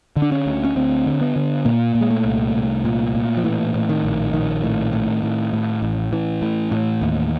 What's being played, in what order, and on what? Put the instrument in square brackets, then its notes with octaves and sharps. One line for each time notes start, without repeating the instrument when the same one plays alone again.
[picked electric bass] D3
D4
C#4
D2
C#4
D2 C4
D3
B3
D3
A#2 A#3
A#2
G#3
A3
C2
C2
A#2
A#2
F3
A2 E3
A2
D#3
A#1
A#1 D#3
A2
A2
A2
A2
A1
A1 E3
A2
A2
D#2